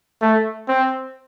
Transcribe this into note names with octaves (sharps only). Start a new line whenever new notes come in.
A3
C4